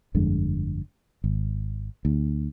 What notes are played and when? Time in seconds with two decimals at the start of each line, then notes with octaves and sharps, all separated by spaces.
0.15 G1 F2 D3 G#3
1.24 G#1
2.05 D2